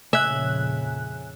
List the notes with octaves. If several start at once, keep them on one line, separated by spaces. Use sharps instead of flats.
F2 A#2 C#3 E5 G#5 F#6